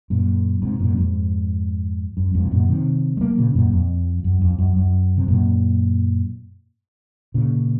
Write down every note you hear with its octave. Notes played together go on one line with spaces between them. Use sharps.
F#2 A#2
G#2 C3
F#2 A#2
F2 G#2
F#2
F2 G#2
C3
F#2 A#2
C3 D#3
G#3
F#3 A#3
A#2 C#3
F#2 A#2
F2
F#2
F2
F#2
F#2
C3
F#2 A#2
A#2 C#3